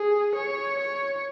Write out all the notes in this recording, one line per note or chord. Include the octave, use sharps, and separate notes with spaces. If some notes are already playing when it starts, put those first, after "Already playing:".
Already playing: G#4
C#5
C#5